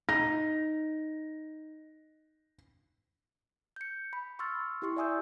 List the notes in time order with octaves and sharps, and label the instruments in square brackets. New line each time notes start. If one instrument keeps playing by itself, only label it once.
[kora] D#4 [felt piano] A#6
[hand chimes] G6 C#7
B5
C6 C#6 E6 F6 A6
E4 G4 C6 C#6
D5 E5 G#5 D#6 E6 G6